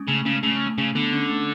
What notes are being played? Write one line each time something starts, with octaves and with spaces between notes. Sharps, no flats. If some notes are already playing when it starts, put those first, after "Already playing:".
Already playing: G#3 C#4
C#3 A3
C#3 A3
C#3 A3
A3
A3
C#3 A3
D3 B3
C#4
A3